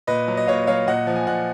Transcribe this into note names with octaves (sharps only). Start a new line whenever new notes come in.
A#2 B4 D#5
F#3
D#5
A#2 C#5 F5
F#3 C#5 F5
A#2 D#5 F#5
F3
G#5
A#2 D#5 F#5